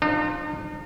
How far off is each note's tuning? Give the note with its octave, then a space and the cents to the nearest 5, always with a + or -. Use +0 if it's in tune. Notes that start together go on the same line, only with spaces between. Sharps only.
F3 +0 D#4 -45